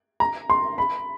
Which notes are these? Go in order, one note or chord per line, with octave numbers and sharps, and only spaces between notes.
A#5
C6
B5